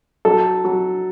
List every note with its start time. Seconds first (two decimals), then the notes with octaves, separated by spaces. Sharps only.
0.25 F#3 A4
0.65 F#3